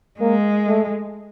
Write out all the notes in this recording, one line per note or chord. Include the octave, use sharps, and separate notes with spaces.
G#3 A#3
A3